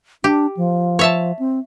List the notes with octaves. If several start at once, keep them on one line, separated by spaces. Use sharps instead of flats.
D4 G4
F3
C#5 E5 A5
C4